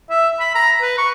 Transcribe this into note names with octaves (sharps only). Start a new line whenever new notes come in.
E5
B5
A#5
B4
C#6